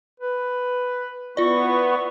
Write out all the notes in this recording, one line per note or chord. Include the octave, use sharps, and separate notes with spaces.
B4
B3 E4 F4 D5 C#6